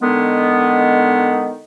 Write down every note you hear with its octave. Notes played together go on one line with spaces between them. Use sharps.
D3 D#3 G#3 B3